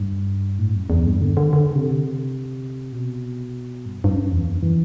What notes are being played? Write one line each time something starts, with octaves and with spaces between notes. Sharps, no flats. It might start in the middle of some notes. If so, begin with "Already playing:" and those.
Already playing: G2
A2
F#2
E2
G2
D3
D3
D3
C3
B2
G2
G2
F#2
E2
F#2
E3